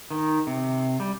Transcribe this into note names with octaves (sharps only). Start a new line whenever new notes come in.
D#3
C3
G3